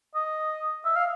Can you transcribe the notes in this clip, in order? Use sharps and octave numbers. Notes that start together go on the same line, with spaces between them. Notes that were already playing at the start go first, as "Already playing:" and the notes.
D#5
E5
F5